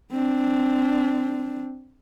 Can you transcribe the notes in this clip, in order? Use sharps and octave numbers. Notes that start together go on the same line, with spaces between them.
C4 D4